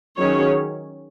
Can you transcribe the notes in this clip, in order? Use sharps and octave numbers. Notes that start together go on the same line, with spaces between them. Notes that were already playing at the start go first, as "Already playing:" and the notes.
D#3 F#3 C#4 G#4 C#5